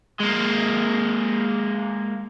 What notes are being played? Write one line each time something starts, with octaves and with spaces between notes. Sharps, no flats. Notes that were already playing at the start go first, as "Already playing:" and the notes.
G#3 A#3